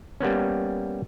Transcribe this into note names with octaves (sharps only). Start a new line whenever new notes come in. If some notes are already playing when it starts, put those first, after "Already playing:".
G3 A#3 B3 C#4